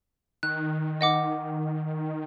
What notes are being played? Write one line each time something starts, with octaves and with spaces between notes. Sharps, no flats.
D#3 F#6
D#5 F#5 D6